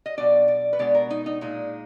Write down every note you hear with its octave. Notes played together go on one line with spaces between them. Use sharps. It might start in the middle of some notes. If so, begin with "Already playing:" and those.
D#5
B2 F#3 D4 D5
D5
B4
B2 G#3 B3 D4 D5
A#4
D#4
D#4
A#2 G#3 D4 D#4